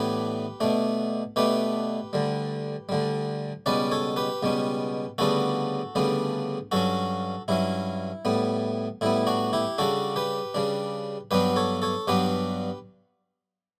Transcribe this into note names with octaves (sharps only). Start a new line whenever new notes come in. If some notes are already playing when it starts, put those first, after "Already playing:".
Already playing: A2 E3 B3 D4 G4 B4
B2 A3 D4
B2 A3 D4 G4 B4
D2 D3 G3
D2 D3 G3
C#2 B2 G3 C#4 B4 D5
A4 C#5
G4 B4
C#2 B2 G3 C#4
D2 C#3 G3 B3 D4 F#4 A4
D2 C#3 G3 B3 D4
G2 F#3 C#4 F#4 A4
G2 F#3 C#4 E4
A2 G3 B3
A2 G3 B3 E4
D4 F#4
E4 G4
C#3 G3 D4 F#4 A4
G4 B4
C#3 G3 D4
G2 F#3 B3 D4 G4 B4
A4 C#5
A4 C#5
G2 F#3 B3 D4 G4 B4